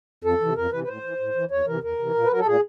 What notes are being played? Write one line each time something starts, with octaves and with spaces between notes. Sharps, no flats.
F2 A4
C3 E3
F2 A#4
C3 E3 B4
B4
A2 C5
E3
A2
E3
E2 C#5
C3 E3 A#4
E2 A#4
C3 E3
A#2
B4
F#3 A#4
A4
A#2 G#4